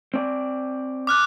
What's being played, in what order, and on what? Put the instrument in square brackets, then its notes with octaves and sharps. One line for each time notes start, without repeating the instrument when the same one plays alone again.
[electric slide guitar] C4 D5
[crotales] D6 F6 F#6